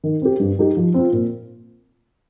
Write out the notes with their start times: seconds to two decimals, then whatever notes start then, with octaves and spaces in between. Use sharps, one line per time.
0.04 D#3
0.22 C4 G4
0.40 G2
0.59 G3 D#4 G4
0.77 F3
0.94 C4 F4
1.13 A#2